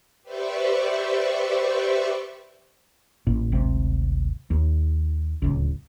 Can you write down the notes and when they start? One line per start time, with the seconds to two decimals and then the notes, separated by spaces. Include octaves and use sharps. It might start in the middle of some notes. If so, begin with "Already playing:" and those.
0.22 G4 B4 C5 D5 E5 C#6
3.27 A1 A#2 A#3
3.52 D1 G#1 C3 C4
4.50 D#2
5.42 D1 G#1 C#2